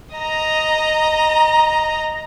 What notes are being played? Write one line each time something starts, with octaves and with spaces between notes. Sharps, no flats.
D#5 A#5